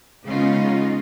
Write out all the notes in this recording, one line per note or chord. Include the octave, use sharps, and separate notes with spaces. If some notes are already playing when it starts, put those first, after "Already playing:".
C#3 G#3 B3 C#4 D#4 F4